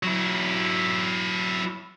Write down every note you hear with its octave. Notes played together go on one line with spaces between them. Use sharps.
F#3 E4